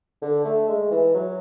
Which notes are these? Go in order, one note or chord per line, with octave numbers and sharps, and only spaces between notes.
D3
A3
G#3
E3
F#3